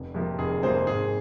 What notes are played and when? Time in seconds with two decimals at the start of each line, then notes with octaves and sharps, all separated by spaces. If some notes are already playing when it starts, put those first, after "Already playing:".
Already playing: F1
0.14 F2 C3 F3 A#3
0.39 F1 G#4
0.63 F2 C3 F3 A#3 G#4 C5
0.87 G#1 G#4